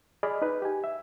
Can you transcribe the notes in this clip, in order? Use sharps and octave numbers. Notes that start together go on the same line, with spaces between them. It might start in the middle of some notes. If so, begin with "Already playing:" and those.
G#4 D5 D#5 B5 F6
D#4 B4
G4 G#5
E5